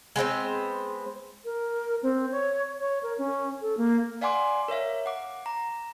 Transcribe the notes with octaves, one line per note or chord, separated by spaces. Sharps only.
G#3 B3 C4 C5
A#4
C4
C#5
C#5
A#4
C#4
A4
A#3
D5 F5 F#5 G#5 C6 D6
A#4 C#5 E5 F5
F#5 D6
A#5